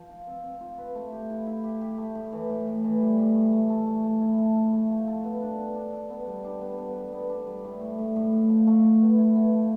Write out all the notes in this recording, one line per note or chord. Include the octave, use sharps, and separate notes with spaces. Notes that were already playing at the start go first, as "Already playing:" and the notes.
Already playing: F3
F4
C4
C4
F4
B4
A3
G4
E4
E4
G4
G4
A3
A2
E3
A2
A2
E3
G3
A2
A2
A3
A4
A3
A3
E4
A4
E4
A3
F3
A4
B3
D4
B3
D4
A4
B3
G3
D4
B3
B3
G3
B3
D4
G3
A2
A2
A2
A2
A2
F3
A3
A2
B3
E4
B3
F3